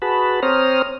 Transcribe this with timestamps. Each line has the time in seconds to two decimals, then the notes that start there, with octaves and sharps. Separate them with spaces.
0.02 F#4 G#4 B4 A5 B5
0.43 C4 C5 C#5 A#5 D#6 F6